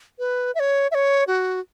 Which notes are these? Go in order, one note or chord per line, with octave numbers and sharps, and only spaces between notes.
B4
E5
C#5
E5
C#5
F#4